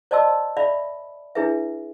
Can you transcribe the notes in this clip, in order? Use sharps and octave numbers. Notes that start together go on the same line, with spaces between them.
C5 D5 D#5 A5 C6 E6
D5 E5 F5 B5
D4 E4 G#4 B4 E5